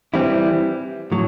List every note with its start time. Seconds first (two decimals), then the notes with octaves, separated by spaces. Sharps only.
0.14 E3 G3 C4 E4
1.12 A2 F#3